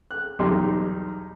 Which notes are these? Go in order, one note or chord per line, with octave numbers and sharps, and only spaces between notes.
F#6
B1 E2 G3 D#4 G4 C6